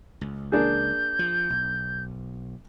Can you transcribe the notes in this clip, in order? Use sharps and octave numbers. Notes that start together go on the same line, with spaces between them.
C#2
A#3 D4 G#4 G6
F3
B1